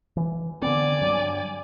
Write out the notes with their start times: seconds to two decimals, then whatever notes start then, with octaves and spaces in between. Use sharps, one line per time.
0.17 E3
0.62 D3 B3 C4 D5 G#5
1.02 G2 F#3